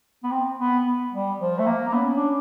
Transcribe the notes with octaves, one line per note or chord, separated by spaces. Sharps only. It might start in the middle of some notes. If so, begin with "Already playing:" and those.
B3
C4
B3
B3
G3
F3
A3
A#3
A#3
B3 C#4
D4